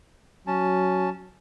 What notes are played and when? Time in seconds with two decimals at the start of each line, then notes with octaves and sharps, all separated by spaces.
0.47 F#3 C#4 A5